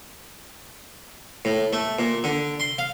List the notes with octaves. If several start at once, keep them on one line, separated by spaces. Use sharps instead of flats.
A2
A3
A#2
D3
C6
F5